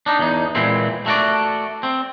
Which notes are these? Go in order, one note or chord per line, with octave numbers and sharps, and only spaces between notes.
D4 D#4
E2 D#4
A#2 E3 G#3 C4
A3 F#4 D5
C4